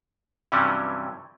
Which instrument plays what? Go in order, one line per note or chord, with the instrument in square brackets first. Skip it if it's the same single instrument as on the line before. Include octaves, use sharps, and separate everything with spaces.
[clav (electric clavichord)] G2 C3 E3 F#3 G3 C#4